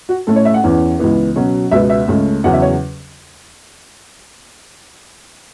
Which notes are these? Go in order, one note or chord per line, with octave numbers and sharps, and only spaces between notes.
F#4
A2 A3 C#4 A4
C#5
E5
F#5
E2 E3 C#4
C#2 C#3 E3 B3
B2 F#3 C#4
C#2 B2 B3 E5
E5
C#2 C#3 A3 C#4
E2 C#3 F#3 C#4 F#5
E5
C#5